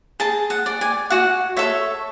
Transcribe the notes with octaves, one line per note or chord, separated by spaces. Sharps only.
G#4 A5
F#5
D5
G#5
F#4 F#5
A4 C#5 E5